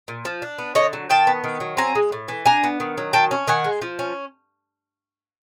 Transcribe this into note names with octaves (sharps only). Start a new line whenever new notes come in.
A#2
F3
D4
B3
D3 C#5 D#5
F#3
D#3 G5 A5
B3
D#3
F#3
C4 G#5 A#5
G#3
A2
E3
D4 G#5 A#5
B3
D#3
F#3
D#3 G5 A5
C#4
D#3 F#5 G#5
G#3
F3
C#4